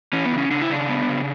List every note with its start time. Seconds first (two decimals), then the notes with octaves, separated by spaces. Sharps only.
0.13 E3 C#4
0.25 B3
0.32 C#3
0.38 C#4
0.51 C#3 D4
0.62 E4
0.70 C#3 D4
0.89 B3
1.09 C#3